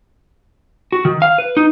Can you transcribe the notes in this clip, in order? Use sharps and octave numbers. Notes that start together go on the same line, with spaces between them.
F#4
D#3
F5
B4
D#4